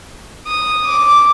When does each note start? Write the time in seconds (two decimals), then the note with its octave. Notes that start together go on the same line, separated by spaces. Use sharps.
0.47 D#6
0.87 D6